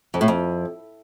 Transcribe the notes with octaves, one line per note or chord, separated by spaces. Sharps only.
F2
A2
F2